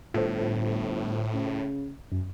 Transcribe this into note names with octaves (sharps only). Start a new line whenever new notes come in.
G1 A2 F4 A4 C5
C#3
F#2